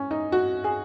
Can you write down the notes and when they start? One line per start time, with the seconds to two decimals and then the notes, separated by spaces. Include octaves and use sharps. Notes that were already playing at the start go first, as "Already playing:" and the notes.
Already playing: C#4
0.11 D#4
0.32 F#4
0.64 G#4